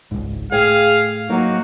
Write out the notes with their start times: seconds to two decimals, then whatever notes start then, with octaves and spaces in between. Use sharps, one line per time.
0.11 G#1 C#2 G#2
0.52 A2 G#4 F5 G5
1.30 F#3 A#3 D#4 F#4